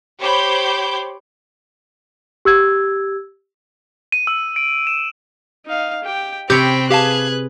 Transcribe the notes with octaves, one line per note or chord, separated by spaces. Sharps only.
G4 C5 C#5 B5 D6 G6
G4 E6 G#6
D#7
E6
D7
E7
D#4 F5
G4 G5
C3 C4 G4 C#5 G5 B5 G6
G4 G#4 B4 F5 A5 F#6 G#6